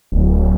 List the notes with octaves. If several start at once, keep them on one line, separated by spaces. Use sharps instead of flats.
D1